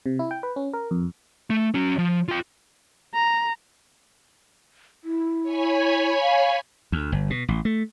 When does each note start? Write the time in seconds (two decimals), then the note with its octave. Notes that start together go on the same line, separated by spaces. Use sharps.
0.06 C3
0.19 E4
0.31 G5
0.43 B4
0.56 C#4
0.74 A#4
0.91 F2
1.50 A3
1.74 C#4 F#4
1.98 F3
2.28 F4 G5
3.14 A#5
5.04 E4
5.43 C#5 G#5 B5
6.22 F5
6.92 D2
7.12 G1
7.30 B2
7.48 A1
7.65 A3